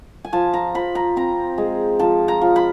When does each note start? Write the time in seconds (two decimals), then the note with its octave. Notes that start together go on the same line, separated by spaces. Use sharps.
0.25 G#5
0.33 F3 A5
0.53 A#5
0.75 F3 B5
0.95 A#5
1.16 C4 A#5
1.58 G#3
1.99 F3 A5
2.28 A#5
2.41 F3
2.56 B5